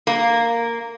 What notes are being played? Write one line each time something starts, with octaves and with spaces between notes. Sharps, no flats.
A#3